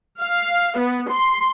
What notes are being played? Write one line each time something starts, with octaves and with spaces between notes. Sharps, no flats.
F5
B3
C6